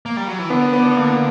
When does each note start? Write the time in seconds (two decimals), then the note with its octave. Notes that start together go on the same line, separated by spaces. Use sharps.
0.06 A#3
0.17 G3
0.28 F#3
0.39 E3
0.50 D3 B3
0.73 B3
0.96 A#3